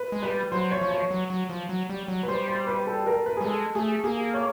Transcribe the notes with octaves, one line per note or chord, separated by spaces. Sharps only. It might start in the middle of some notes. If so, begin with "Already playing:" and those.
Already playing: B4
G#3
G3 B4
F#3 C5
C#5
F3
C#5
F#3
F#3
F3
F#3
G3
F#3
B4
G3 C5
C5
B4
A4
A#4
B4
G3 G#4
G#3 A4
A3 G#4
A#3 G#4
C#5